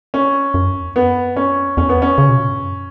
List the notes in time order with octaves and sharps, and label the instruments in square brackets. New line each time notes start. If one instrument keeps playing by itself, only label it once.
[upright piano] C#4
[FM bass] F#2
E2
[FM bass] F#2 [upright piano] B3
[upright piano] C#4
[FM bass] E2 [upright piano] C#4
[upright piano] B3
C#4
[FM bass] C#3
B2
A#2
G2
F#2